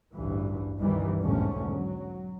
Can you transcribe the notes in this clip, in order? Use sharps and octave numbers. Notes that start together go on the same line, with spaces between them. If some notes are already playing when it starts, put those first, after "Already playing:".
A1 D2 G2 E3
G1 C#2 B2 D#3 E3 G3
B1 E2 G#2 D3 A3 C#4
F#3